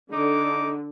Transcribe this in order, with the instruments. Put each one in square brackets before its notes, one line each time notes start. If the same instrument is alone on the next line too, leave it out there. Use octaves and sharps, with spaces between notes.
[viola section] D3 [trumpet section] D#4 D6